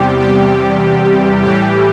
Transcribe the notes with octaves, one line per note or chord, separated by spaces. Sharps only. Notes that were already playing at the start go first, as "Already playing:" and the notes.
Already playing: E2 C3 G3 G4
G4
A2 E3 G3 G4